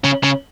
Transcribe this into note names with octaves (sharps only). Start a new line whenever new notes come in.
C#3
C#3